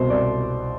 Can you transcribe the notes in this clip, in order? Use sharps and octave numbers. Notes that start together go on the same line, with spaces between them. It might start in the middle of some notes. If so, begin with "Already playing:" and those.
Already playing: C2 B2 C5
C2 D5